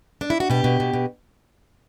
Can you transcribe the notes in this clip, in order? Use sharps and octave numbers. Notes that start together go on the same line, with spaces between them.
D4
E4
F#4
B2 G4
B2
B2
B2